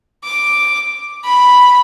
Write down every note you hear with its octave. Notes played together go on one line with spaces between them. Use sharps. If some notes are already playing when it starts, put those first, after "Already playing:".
D6
B5